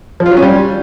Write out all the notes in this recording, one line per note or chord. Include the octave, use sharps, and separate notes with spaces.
F3
F4
F#3
C#4
G3